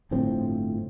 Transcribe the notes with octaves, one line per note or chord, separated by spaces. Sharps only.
G1 A2 F3 C4